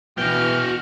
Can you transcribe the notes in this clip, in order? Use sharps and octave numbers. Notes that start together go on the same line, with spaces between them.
B2 E3 F#4 G5 F6